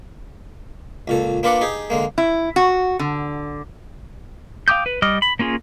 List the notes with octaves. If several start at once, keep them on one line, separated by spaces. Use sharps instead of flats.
C#2 A#2 A4
A#3 D4 F4 B4 D5 F#5
D#4 G4 G#4
D3 G#3 A#3
E4
F#4
D3
F5 G5 D6 D#6 G6
B4
G3 D#5 D6 D#6 F6
B5
A#3 C#4 F4 G#4